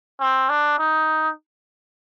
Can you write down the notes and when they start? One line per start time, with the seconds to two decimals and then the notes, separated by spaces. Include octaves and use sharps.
0.21 C4
0.50 D4
0.79 D#4